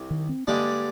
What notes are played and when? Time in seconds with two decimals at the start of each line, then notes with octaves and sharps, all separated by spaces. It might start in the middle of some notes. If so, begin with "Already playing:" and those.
Already playing: C2 C3
0.11 D#3
0.29 C4
0.47 G2 D3 G#3 A#3 D4 G4